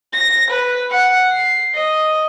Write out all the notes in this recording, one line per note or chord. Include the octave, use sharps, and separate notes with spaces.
A#6
B4
F#5
C7
D#5